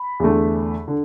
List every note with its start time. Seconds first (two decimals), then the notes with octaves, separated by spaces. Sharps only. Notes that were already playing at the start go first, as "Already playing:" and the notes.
Already playing: B5
0.20 E2 D3 A3
0.88 D3